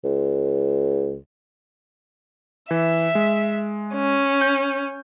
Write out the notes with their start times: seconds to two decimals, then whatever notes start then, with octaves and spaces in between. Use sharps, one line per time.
0.04 C#2
2.71 E3 E5
3.15 G#3
3.95 C#4
4.41 G6